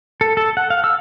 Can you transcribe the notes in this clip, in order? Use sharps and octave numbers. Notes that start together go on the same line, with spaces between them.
A4
A4
F#5
F5
E6